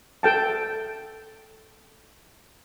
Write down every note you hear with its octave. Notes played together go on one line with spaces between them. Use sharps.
A4 G5 A5